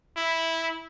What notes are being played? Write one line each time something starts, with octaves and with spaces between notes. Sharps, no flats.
E4